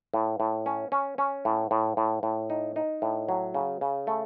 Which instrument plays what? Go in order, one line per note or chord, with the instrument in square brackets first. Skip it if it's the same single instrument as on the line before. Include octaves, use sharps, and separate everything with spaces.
[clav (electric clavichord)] A2
A2
C#4
C#4
C#4
A2
A2
A2
A2
D#4
D#4
A2
F#3
C#3
C#3
A3